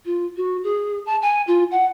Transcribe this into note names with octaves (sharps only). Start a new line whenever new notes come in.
F4
F#4
G#4
A5
G#5
F4
F#5